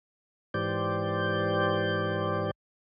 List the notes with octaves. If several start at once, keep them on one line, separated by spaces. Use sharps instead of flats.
G#2 E3 G4 C5 D5 G6